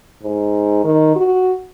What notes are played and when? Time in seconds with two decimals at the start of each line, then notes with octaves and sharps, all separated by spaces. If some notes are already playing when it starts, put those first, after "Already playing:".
0.22 G#2
0.84 D#3
1.16 F#4